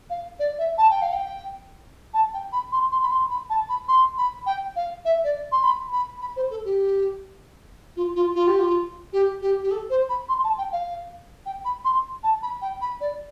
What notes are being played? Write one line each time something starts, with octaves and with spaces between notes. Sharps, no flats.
F5
D5
E5
A5
G5
F5
G5
A5
G5
B5
C6
C6
B5
C6
B5
A5
B5
C6
B5
G5
F5
E5
D5
C6
B5
B5
B5
C5
A4
G4
F4
F4
F4
G4
F4
G4
G4
G4
A4
C5
B5
C6
A5
G5
F5
G5
B5
C6
A5
B5
G5
B5
D5